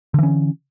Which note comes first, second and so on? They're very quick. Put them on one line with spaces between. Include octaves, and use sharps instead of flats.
D3 E3 C#4